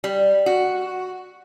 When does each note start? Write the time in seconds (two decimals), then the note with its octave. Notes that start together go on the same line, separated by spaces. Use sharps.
0.04 G3
0.46 F#4